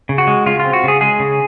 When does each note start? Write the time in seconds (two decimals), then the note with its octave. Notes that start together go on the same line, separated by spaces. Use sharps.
0.09 C#3
0.18 F#4
0.27 G#3
0.46 C#3 F4
0.60 F4
0.65 C4
0.73 F#4
0.84 C#3 G#4
1.01 G#3 G#4
1.20 C#3